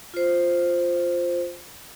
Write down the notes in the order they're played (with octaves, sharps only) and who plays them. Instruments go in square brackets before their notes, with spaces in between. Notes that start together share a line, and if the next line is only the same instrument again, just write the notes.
[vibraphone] F4 C5